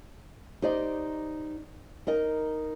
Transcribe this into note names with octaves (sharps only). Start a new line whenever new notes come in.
D#4 G4 C5 D5 D#5
D#4 A#4 D#5